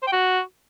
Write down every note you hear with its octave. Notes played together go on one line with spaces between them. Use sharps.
C5
G5
F#4